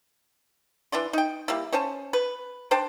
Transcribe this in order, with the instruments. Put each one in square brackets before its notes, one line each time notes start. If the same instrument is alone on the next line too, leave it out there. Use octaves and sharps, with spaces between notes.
[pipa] E3 D4 D5 C6
D#4 G5
G3 A#3 E4
C#4 C5 G#5 A5
B4
D4 C5 G5 A5